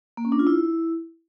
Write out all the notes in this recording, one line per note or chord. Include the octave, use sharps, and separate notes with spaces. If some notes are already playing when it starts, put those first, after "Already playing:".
A#3
C#4
D4
F4
E4